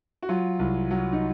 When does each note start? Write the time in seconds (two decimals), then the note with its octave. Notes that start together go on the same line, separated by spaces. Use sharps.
0.22 F#4
0.29 F#3 F4
0.59 C2
0.91 F#3
1.13 D#4